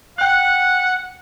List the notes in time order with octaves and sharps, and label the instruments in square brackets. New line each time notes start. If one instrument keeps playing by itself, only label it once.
[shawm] F#5 [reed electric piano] G5 F#6